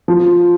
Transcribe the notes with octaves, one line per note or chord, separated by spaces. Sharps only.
F3